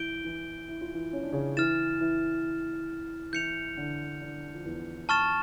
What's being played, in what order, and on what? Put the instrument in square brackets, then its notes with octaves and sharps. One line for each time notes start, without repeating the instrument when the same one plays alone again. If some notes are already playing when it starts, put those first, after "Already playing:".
Already playing: [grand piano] E3 E4 [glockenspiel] G6 D7 G7
[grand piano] E3 E4
E4
F4
E3 E4
C#4
D4
C#3 C#4
[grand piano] E3 E4 [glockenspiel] F6 A6 E7
[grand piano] E3 E4
[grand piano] E3 E4 [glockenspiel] G6 C#7 F7
[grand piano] D3 D4
D3 D4
F3
E2 E3
[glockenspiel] A5 C#6 F6 A6 E7